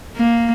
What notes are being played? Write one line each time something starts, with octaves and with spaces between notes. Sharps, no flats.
A#3